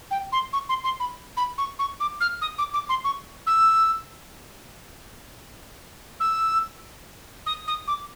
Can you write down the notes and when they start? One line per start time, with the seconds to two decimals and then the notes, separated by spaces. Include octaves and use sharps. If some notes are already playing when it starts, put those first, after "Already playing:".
0.10 G5
0.32 C6
0.53 C#6
0.69 C6
0.84 C6
0.99 B5
1.36 B5
1.58 C#6
1.79 C#6
2.00 D6
2.20 F6
2.41 D#6
2.58 D6
2.73 D6
2.89 C6
3.04 C#6
3.46 E6
6.20 E6
7.46 D#6
7.67 D#6
7.87 D6